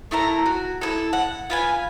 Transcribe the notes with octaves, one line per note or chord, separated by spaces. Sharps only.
A3 E4 A#4 A#5
F#4
E4 G#4 A4
F#5
F4 B4 G#5